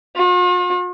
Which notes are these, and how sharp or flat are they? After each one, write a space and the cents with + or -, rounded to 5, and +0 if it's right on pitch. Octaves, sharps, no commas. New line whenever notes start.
F4 +45